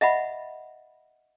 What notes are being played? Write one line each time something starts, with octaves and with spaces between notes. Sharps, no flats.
D#5 E5 F#5 B5